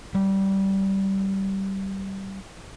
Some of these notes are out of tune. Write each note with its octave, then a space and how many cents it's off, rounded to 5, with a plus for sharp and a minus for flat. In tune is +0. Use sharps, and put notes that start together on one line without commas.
G3 -15